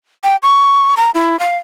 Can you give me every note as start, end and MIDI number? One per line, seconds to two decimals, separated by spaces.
0.24 0.36 79
0.43 0.95 85
0.97 1.11 82
1.15 1.39 64
1.39 1.57 77